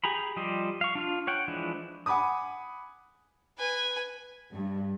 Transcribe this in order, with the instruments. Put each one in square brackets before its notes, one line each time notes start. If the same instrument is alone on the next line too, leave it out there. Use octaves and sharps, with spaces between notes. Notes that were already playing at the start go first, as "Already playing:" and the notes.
[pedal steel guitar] G4 G#4 A#5 B5
F3 G3 G4 C5 D#5
F5 C#6
D4 F4 F5
C#5 F#5 G5
E3 F3 G#3 D4 B4
[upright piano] F#5 G#5 B5 D6 D#6
[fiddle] B4 G#5
[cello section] G2